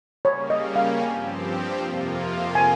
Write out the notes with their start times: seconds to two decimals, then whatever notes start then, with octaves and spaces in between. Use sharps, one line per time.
0.25 C#3 G3 A#3 C#4 C#5
0.50 D#5
0.76 F5
1.02 G2 F3 C4 G4 G#5
1.79 F2 C3 F3 A#3 F4
2.55 G#5